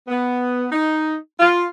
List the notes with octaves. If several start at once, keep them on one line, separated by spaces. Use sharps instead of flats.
B3
D#4
F4